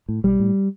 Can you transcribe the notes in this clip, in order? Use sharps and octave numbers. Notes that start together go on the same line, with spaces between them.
A2
B1 G3
A2